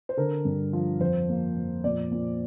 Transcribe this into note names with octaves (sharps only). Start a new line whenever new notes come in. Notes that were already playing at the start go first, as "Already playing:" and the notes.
C5
D3 A#4
G2
F3
F2 C5
A#3
F2
A#2 D5
A#2